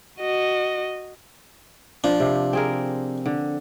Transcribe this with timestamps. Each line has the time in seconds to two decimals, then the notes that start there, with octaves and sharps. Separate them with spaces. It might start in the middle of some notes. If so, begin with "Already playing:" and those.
0.19 F#4 D#5
2.04 F3 D4
2.20 C3
2.53 C4 G#4 A#4
3.26 D3